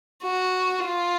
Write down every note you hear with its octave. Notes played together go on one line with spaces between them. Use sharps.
F#4
F4